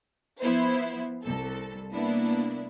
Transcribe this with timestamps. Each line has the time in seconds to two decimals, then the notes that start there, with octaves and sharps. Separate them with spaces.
0.41 F3 B3 E4 C5
1.25 C2 A4
1.94 A#3 B3 D4 E4